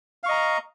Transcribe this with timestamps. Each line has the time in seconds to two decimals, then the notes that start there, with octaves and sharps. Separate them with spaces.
0.23 F5
0.26 C#6
0.29 D#5
0.31 A#5